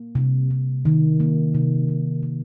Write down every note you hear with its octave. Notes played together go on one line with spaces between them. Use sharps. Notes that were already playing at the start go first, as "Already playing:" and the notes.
Already playing: A#3
C3
C3
D#3
A#3
C3
C3
D#3